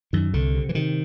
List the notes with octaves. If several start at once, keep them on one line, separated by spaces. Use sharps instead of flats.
F#2 D#3
C2 D3
C3
E3
C3 D#3